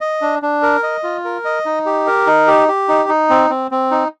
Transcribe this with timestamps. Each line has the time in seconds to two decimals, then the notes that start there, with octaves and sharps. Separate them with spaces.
0.01 D#5
0.22 D4
0.42 D4
0.62 A#4
0.83 D#5
1.04 F4
1.25 A#4
1.45 D#5
1.66 D#4
1.86 G4
2.07 A#4
2.27 D#4
2.48 G4
2.68 G4
2.89 D#4
3.09 D#4
3.30 C4
3.50 C4
3.71 C4
3.91 D#4